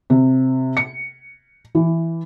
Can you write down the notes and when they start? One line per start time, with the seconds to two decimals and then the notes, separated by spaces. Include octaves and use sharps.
0.10 C3
0.77 C#7
1.75 E3